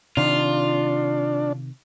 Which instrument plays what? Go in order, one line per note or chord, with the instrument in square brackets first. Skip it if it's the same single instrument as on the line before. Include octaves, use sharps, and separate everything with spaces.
[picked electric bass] C3 D#3 [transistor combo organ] D4 [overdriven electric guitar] F4